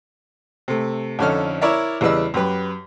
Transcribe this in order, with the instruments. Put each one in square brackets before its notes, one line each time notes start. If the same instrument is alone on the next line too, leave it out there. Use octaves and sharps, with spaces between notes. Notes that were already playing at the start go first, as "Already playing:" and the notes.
[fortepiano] C3 A3
F2 D3 C#4 D#4 A4 F6
E4 A#4 C#5 D5 E5
E2 C#3 G3 B4 D#5 E6
F#2 G4 B4